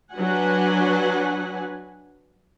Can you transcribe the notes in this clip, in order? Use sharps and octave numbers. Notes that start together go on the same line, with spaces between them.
F#3 D4 F#4 B4 F#5 G#5